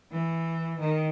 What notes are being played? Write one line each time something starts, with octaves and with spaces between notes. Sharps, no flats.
E3
D#3